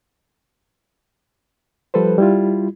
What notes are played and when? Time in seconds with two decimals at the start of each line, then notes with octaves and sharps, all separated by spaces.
1.94 F3 G3 A4 B4 C5
2.18 G3 E4 F4